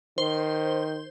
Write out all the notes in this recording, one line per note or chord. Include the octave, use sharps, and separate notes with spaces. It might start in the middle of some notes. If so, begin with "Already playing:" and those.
D#3 C5